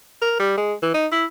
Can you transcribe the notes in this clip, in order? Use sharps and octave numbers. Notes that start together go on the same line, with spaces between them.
A#4
G3
G#3
E3
D#4
E4